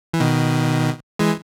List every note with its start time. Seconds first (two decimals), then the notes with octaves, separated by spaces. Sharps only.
0.14 E3
0.20 B2 D#3
1.19 E3 G#3